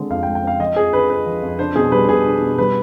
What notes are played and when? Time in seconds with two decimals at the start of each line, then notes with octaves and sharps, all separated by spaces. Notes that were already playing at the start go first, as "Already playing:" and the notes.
Already playing: D3 G#3 C4
0.10 F2 F5
0.23 G5
0.27 G#3
0.35 G5
0.44 C4 F5
0.60 F3 D#5
0.76 F2 G#4
0.93 D3 B4
1.10 F2 B4
1.26 F3
1.42 F2
1.59 D4 C5
1.76 B2 G#4
1.92 G3 B4
2.08 B2 G#4
2.25 D4
2.42 B2
2.58 G3 B4